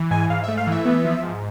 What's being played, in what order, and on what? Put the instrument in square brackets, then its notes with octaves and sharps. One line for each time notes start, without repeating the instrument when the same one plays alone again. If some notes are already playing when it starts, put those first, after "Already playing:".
Already playing: [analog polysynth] E3
G#2 G#5
G#2 F5
A3 E5
F5
E3 E5
B3
F3
G#2